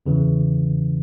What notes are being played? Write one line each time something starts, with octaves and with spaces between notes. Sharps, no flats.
E2 C#3 E3